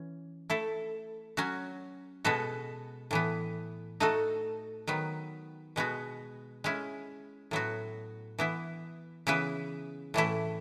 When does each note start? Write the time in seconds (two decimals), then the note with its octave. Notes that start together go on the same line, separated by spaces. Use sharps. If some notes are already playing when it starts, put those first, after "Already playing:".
Already playing: E3 C#4
0.50 A3 E4 A4
1.37 F#3 C#4 F#4
2.25 B2 G#3 B3 F#4 A4
3.11 A2 E3 B3
4.00 A3 D#4 F#4 A4
4.87 D#3 F#3 B3
5.76 B2 G#3 B3 F#4
6.64 G#3 C#4 E4
7.51 A2 F#3 B3 F#4
8.39 E3 B3 E4
9.27 C#3 E3 B3 E4 B4
10.14 A2 E3 A3 E4